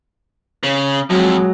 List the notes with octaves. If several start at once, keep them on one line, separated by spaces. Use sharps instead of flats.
C#3
F2 F#3 G#3